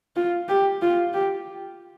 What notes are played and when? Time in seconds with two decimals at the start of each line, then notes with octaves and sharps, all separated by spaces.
0.16 F4
0.48 G4
0.82 F4
1.14 G4